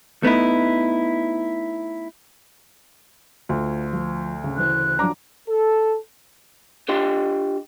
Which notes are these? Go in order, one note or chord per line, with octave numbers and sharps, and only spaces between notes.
A3 B3 D#4 E4
D2 F4
F3
C#3
C#3 E3 C5 F#6
F3 F#3 D4 A#5 D6
A4
D4 F4 G4 D#5 G5 C6